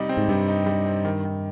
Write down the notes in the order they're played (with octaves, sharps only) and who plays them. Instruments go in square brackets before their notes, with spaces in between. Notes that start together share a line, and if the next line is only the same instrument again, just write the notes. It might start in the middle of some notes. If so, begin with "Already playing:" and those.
Already playing: [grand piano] C3 G3 D#4
C4
[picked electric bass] G#2
[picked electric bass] G2 [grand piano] C3
[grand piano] D#4
G3
C4
D#3
D#3